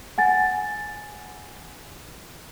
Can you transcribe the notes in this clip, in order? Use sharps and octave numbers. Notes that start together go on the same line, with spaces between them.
F#5 G#5 A6